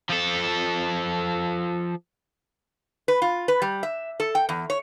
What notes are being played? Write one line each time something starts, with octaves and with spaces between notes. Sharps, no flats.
F3 A4
B4
F4
B4
G3
E5
A4
G5
E2
C#5